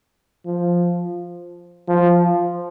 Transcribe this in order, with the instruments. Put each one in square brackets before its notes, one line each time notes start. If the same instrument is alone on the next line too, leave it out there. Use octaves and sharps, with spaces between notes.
[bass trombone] F3
F3